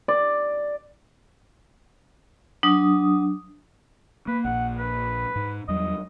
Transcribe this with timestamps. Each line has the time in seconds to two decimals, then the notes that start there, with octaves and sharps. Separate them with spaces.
0.08 D5
2.63 F#3 D4 D#6
4.27 A#3 B4
4.44 A#1 A#2 F#5
4.78 B4
5.36 G#2
5.68 E2 F#3 G3 D#5